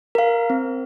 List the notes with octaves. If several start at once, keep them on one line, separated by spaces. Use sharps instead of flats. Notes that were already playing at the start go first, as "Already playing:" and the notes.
A#4 F5
C4